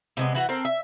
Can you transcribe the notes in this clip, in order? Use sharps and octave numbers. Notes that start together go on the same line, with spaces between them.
C3 G#3 B3
E3 F#4 F#5
C4 A4 A#4
E5